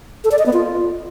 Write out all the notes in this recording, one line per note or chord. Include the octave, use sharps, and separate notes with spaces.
A4
D5
D#5
B3
F4